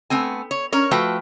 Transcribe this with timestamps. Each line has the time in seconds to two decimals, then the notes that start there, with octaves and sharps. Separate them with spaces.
0.10 A3 B3 C4 G#5
0.51 C#5
0.72 C#4 A#4 C#5
0.91 F3 A3 F#4 B4 G5